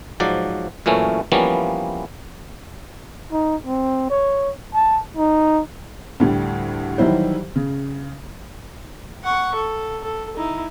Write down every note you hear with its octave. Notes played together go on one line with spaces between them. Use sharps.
G#2 F3 F#3 D5
F#2 A#2 E3 A3 C#4
E3 F3 G3 A#3 B3 C#4
D#4
C4
C#5
A5
D#4
D2 A2 G3
D#3 E3 F#3 G3 E4 C5
C#3
F#5 C#6
A4
A4
D#4 E4